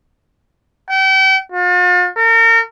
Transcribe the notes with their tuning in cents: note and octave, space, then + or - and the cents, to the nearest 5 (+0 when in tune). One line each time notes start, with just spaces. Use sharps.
G5 -40
F4 +45
A#4 -35